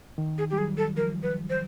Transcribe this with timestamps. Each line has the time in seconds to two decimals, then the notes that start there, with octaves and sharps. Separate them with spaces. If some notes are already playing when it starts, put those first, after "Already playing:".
0.18 D#3
0.38 G#4
0.50 G3 G4
0.58 F#3 G#4
0.77 A4
0.97 F3 A#4
1.23 B4
1.50 C5